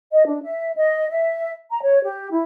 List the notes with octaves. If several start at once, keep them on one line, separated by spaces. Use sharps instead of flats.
D#5
D4
E5
D#5
E5
A#5
C#5
G4
E4